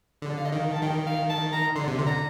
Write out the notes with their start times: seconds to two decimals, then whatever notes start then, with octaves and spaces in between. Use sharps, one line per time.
0.22 D3
0.37 F5
0.45 D#5
0.52 D#3 F5
0.72 A5
0.83 D#3 G5
1.07 F5
1.30 A5
1.53 A#5
1.76 D3 C6
1.87 C3
1.99 D3
2.07 A#5